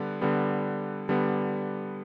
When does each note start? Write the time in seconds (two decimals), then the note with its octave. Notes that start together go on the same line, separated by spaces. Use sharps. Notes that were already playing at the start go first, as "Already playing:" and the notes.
Already playing: D3 G3 B3
0.21 D3 G3 B3
1.09 D3 G3 B3